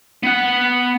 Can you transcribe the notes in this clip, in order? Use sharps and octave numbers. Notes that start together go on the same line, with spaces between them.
B3 F#5